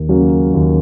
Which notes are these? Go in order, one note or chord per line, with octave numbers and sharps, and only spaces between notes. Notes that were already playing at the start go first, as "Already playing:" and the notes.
Already playing: D#2
C#3 F#3 A#3
D#2